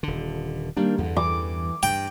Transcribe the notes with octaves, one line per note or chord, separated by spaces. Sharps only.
D#1 D3
D#3 G3 A#3 D4
E2 G2 D3
E3 D6
G2 G5